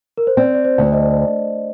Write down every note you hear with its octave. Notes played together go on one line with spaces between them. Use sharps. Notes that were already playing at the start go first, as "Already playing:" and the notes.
A#4
C5
C4 D5
D5
C5
D2
D#5